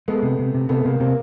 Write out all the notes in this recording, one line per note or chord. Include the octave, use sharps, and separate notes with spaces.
G#3 A3 B3
C3
C3
C3
C3 A3 B3
C3 G#3 A#3
C3 A#3 C4